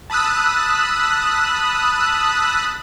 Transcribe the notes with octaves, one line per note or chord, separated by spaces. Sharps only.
A5 B5 D#6 E6 F#6